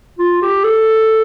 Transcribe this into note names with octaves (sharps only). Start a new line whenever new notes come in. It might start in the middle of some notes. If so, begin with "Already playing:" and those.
F4
G4
A4